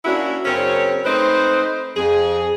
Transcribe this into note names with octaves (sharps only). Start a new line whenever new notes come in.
A#3 C#4 D4 E4 F#4
F#2 C#3 C4 C#4 A#4 C#5
A3 C4 D#4 B4 C5
F2 G#4